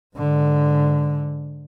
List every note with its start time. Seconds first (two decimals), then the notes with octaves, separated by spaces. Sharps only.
0.16 G#2 D3